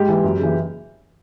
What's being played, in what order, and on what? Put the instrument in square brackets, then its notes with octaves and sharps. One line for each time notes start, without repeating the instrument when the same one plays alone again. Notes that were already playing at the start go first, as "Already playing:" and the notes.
Already playing: [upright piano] G#2 G4
E3
F#2
C#3 E3